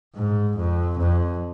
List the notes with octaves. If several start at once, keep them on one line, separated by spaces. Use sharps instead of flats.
G#2
F2
F2